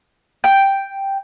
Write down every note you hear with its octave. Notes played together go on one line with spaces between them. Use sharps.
G5